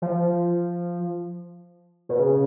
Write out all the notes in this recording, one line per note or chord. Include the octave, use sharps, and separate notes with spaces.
F3
B2
C#3